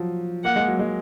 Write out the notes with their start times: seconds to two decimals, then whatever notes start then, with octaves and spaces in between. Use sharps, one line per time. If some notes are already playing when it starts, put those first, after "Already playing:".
Already playing: F3 F#3
0.44 A#3 F#5
0.56 G#3
0.68 F#3
0.79 G#3